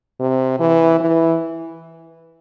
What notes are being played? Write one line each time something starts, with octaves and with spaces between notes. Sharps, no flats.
C3
E3
E3